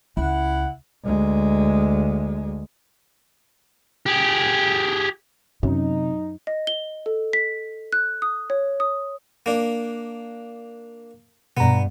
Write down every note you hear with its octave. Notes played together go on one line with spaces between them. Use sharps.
C#2 E4 F#5
D2 G#3
G4 G#4
F#2 C3 D#4
D#5
G7
A4
B6
F#6
D#6
C#5
D#6
A#3 D4
D2 G2 B2 B3 A#5